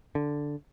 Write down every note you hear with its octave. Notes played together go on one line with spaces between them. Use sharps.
D3